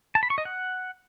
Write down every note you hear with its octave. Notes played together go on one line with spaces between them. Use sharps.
A5
B5
C#6
D#5
F#5